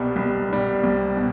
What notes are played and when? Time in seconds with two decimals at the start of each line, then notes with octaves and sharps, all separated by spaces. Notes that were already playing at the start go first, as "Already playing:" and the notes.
Already playing: C2 B2 G3
0.16 C2
0.50 B2 G3
0.83 C2
1.17 B2